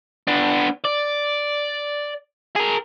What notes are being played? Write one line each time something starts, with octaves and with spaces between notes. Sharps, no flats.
B3 D4
D5
G#4 A#4